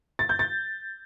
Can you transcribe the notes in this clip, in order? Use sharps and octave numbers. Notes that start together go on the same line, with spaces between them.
A6
G6
A6